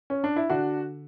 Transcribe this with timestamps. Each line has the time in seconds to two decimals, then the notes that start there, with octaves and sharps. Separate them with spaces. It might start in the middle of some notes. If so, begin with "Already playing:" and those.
0.10 C#4
0.24 D4
0.36 E4
0.50 D3 D4 F#4